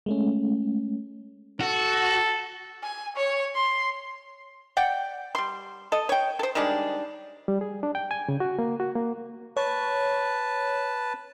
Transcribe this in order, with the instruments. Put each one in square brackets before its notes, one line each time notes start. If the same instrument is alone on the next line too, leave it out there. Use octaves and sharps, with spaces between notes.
[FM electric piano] G#3 A3 C#4
[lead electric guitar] F#4 [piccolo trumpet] A4
[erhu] G#5
C#5
C6
[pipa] D5 F#5 G5
G3 C6
A4 D#5
C#5 G5
A4 C5
D#3 G3 G#3 D4
[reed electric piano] G3
G#4
D4
G5
G#5
C#3
F#4
A#3
F#4
A#3
[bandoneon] B4 A5 [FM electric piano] C#5